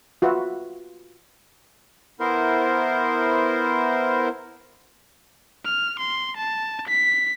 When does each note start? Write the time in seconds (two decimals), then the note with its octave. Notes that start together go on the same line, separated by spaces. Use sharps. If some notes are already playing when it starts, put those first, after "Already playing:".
0.22 F4 F#4 B4 E5
2.20 B3 E4 A#4 C5
5.65 F6
6.00 C6
6.37 A5
6.88 B6